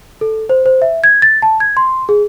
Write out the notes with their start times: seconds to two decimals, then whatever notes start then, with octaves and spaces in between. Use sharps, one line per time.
0.21 A4
0.49 C5
0.66 C5
0.82 E5
1.04 G#6
1.22 A6
1.42 A5
1.60 G#6
1.77 C6
2.09 G#4